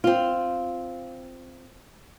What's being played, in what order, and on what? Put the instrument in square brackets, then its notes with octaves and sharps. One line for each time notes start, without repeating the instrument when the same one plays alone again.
[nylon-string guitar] C4 F4